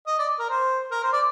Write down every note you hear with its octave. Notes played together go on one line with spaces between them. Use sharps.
D#5
D5
A#4
C5
A#4
C5
D5